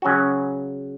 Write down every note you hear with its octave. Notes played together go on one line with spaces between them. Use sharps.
C#3 F#3 C#4 F#4